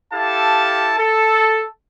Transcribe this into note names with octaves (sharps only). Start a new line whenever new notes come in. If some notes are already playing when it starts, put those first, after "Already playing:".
E4 G4 A4 F5 A5
A4